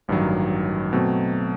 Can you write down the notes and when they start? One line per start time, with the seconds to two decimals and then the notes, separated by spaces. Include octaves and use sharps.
0.08 A1 G2 D#3 F#3
0.93 B2 F#3 A3 C4